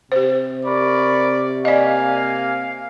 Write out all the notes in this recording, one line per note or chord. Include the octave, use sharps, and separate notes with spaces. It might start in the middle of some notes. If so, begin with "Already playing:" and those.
C3 G4 C5
A#4 D5 B5 C#6
A#3 D5 D#5 F5 G#5